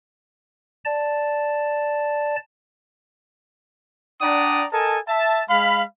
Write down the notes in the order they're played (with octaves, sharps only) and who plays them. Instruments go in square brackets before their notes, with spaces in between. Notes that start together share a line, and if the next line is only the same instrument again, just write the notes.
[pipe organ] D5 A5
[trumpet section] D4 D5 F#5 G5 A#5 D#6
A4 A#4 D#5 G#5 A5
E5 A5
G#3 F5 B5